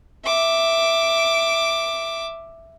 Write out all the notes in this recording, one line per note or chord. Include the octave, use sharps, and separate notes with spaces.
E5 D6